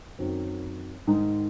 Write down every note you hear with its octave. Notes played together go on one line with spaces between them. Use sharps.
F#2 D#3 F#3 C4
G#2 D#3 G#3 D#4